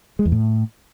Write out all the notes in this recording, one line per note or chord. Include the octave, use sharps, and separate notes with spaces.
G#3
E2
A2